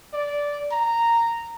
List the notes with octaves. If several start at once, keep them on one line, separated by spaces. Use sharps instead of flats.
D5
A#5